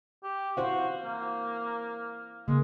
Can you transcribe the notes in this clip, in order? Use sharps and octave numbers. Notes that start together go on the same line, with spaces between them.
G4
E4 F#4 C5 F5
A#3
C#3 G#3 A#3